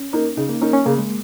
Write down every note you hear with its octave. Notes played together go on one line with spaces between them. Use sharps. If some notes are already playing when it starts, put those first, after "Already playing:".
Already playing: C#4
A#3 D#4
C#3 D#4
A#3
A#3 C#4 D#4
C#4
C#3 A#3
G#3